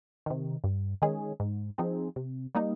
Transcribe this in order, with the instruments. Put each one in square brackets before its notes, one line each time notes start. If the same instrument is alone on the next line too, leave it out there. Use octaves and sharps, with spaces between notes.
[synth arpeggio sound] C3 D#3
G2
D#3 G#3 C#4 G#4
G#2
F3 C4 D#4 G#4
C3
G3 A#3 D#4